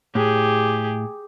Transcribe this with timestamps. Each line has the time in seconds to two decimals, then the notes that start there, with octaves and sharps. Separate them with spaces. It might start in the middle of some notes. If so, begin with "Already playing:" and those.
0.15 A2 G4 G#4